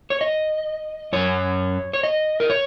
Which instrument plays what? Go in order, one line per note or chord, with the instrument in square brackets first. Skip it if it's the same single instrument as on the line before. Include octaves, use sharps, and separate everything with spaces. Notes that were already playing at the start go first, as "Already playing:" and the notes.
[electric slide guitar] C#5
D#5
F#2 F#3 C#5
C#5
D#5
A#4
C#5